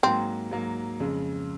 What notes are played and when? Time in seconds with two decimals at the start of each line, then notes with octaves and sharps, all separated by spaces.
0.03 G#2 F#3 A#3 C4
0.51 G#2 F#3 A#3
1.00 F2 C#3 G#3